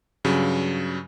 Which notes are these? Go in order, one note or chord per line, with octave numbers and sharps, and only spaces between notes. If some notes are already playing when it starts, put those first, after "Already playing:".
G2 C#3 F#3